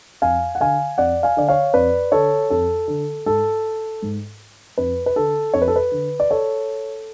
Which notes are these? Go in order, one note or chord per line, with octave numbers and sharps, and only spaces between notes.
F2 F5 G#5
F#5
D3 F5 G#5
F2 D5 F#5
F5 G#5
D3 D5
C#5 F5
F2 B4 D5
D3 A4 C#5
F2 A4
D3
G#2 A4
G#2
F2 B4
B4
D3 A4
F2 C#5
B4
A4
B4
D3
D5
A4 C#5